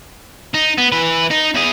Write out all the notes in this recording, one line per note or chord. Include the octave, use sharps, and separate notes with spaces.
D#4
B3
E3 B4
D#4
E2 G#4